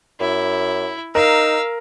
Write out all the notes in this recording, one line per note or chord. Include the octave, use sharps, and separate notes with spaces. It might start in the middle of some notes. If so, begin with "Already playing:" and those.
F#2 E4
D#4 A#4 F5 E6